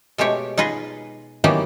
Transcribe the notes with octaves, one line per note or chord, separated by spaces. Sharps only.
B2 G#3 A3 G4 C#5
D#4 F4 G#4 B4 D#5
D#3 E3 F#3 A#3 B3 G4